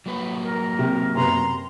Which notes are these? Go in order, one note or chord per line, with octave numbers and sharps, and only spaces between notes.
F#3 A#3 B4
A#4
C3
F#2 C3 B3 A#5 C6